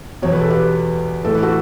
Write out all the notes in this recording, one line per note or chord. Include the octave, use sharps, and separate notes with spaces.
E2 B2 C#5
B4
A4
G4 B4
A2 E3 A4
B4
F#4 A4